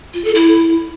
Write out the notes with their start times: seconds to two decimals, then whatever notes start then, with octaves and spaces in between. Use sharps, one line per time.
0.14 F4
0.24 A4
0.35 E4